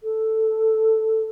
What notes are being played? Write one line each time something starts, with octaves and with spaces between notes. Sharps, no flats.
A4